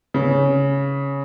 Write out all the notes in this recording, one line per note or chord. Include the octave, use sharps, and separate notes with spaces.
C#3